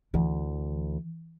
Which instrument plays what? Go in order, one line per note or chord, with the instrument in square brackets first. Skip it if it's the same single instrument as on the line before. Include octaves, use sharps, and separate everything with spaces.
[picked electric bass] D2 [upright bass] E3